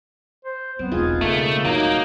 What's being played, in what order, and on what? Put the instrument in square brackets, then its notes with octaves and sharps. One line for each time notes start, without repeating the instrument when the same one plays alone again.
[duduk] C5
[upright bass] F#3 [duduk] B3 [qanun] C4
[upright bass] E1 B1 [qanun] D#4 F4 G#4
[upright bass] B1 [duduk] C#3 [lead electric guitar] A3 [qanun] A#3
[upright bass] A2 [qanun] F#3 [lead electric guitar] A#3 [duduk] D#4
[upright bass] D1